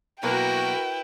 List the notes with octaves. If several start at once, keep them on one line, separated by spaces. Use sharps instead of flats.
B2 F#3 A#3 E4 F#4 A#4 B4 G5